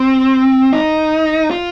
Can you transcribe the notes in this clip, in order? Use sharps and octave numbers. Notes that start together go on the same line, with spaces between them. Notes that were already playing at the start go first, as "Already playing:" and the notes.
Already playing: C4
D#4
F4